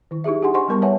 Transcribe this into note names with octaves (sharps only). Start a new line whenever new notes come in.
D#3 E4
D#4 E4 G4 G#4 E5
D4 G4 G#4 F#5 G#5 C6
C5 D#5 F#5 G#5 C6 C#6
G3 B3 A#4 A5 C#6
B4 C#5 E5 F#5 G#5 A5